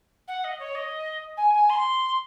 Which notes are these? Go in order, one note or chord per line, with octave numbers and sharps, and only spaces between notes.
F#5
D#5
C#5
D#5
G#5
G#5
C6